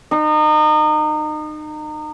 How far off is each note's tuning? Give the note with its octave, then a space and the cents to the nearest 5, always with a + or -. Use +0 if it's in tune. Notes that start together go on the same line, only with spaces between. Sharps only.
D#4 -30